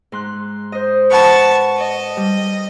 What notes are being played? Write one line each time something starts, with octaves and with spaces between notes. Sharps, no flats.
G#2 C6 F#6
C5 D#5
B4 F#5 A5 B5 C#6
D#5
G3